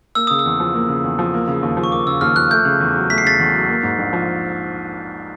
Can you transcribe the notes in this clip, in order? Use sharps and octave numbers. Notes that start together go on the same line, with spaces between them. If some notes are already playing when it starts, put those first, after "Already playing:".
A#3 E6
C#3 D#6
E6
E2
F3
A#3
C#3
E2
F3
A#3
C#3
D#2
F3
C#6
A#3 D6
C#3 E6
D#2 F6
F3 F#6
A3 G6
C#3
E2
F#3
A3 B6
C7
C#3 A6 B6
E2
F#3
A#3
G#2
A#1
F3